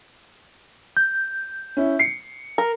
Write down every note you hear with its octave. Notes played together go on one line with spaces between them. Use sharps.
G6
C#4 E4
C7 C#7
A#4